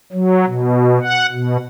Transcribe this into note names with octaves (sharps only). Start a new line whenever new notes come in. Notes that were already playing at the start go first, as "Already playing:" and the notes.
F#3
B2
F#5
B2